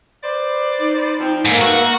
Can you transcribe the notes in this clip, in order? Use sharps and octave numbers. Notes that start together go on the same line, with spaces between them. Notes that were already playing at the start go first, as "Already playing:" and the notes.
B4 C5 D5
D#4
F3 C4
G#2 D3 A#3
C#3 B3 F#4 E5